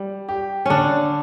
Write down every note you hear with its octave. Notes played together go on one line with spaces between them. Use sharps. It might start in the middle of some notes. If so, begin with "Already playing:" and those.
Already playing: G3
G4
D3 C#4 D4